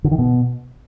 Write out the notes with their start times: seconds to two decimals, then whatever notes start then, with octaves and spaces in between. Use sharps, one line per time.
0.04 D3
0.11 D#3
0.18 B2